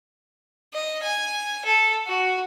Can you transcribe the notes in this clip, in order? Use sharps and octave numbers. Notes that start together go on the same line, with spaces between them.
D#5
G#5
A4
F#4